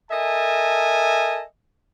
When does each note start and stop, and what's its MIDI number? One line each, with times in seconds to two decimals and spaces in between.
0.11 1.42 69
0.11 1.42 70
0.11 1.42 75
0.11 1.42 76
0.11 1.42 80
0.11 1.42 81